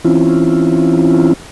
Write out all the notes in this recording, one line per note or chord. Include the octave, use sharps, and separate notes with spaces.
E3 C4 C#4 E4 F4